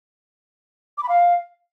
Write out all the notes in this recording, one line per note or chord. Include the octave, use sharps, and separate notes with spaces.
D6
B5
F5